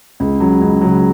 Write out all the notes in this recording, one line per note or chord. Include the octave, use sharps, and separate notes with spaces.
C#2
C#3 F#3
C#2
C#3 F#3